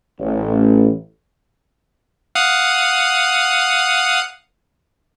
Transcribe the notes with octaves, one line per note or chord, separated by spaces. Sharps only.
A1
F5 F#5 D#6